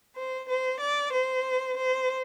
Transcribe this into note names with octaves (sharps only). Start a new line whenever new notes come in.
C5
C5
D5
C5
C5